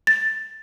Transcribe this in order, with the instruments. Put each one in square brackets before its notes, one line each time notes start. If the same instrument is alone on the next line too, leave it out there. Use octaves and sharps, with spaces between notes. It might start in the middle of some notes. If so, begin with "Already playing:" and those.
[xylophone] A6